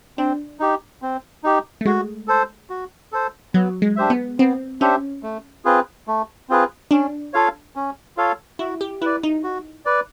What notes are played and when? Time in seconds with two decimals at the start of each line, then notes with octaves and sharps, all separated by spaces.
0.18 C4 D4
0.60 D#4 G4
1.02 C4
1.44 D#4 G4
1.81 A3
1.85 G#3 F#4
2.28 A4 C5
2.70 F#4
3.12 A4 C5
3.54 F#3 B3
3.82 G#3
3.96 D4 G4 C5 E5
4.10 B3
4.38 B3 C4
4.81 C#4 D4 G4 C5 E5
5.23 A3
5.65 C4 F4 G#4 B4
6.08 A3
6.49 C4 F4 G#4 B4
6.91 C#4 D4
7.33 F4 A4 C#5 F5
7.76 C#4
8.17 F4 A4 C#5 F5
8.59 E4 F#4
8.81 G4
9.01 E4 B4 D5
9.23 D#4
9.44 F#4
9.85 B4 D5